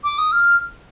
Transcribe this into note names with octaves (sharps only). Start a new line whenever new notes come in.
D6
D#6
F6